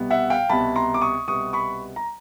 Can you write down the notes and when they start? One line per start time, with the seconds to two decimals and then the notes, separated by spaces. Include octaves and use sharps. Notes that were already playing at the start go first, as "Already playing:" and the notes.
Already playing: C2 B2 G3 B3
0.10 E5 F#5
0.30 F5 G5
0.49 C2 B2 G3 B3 A5 B5
0.76 A#5 C6
0.94 D6
1.02 C#6 D#6
1.28 C2 B2 G3 B3 C#6 D#6
1.53 B5 C#6
1.96 A#5